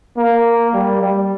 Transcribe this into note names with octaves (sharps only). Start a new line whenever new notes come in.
A#3
G3
G3